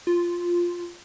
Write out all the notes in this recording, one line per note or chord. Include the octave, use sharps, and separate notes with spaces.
F4